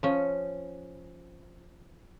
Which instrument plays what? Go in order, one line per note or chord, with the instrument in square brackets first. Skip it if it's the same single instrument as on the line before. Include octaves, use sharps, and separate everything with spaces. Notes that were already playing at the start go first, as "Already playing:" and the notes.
[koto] F3 C#4